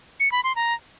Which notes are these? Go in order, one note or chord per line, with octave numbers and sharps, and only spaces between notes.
C#7
B5
C6
A#5